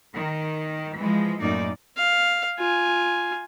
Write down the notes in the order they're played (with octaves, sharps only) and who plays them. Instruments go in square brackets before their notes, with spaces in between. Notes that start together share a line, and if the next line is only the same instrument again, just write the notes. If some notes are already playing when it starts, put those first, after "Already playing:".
[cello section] D#3
E3 F3 G#3
F#2 A2 A#3 D#4 D5
[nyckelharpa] F5
F4 G#5